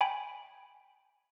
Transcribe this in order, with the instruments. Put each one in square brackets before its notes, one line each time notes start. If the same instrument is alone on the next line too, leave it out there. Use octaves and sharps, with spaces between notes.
[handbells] G5 G#5 B5 D7